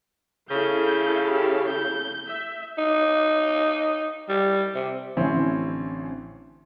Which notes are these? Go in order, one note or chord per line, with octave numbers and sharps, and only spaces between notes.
C#3 E4 A4 F5 G6
G4
G6
E5
D#4
G3
C3
A1 D3 C4 C#4 E4 G#5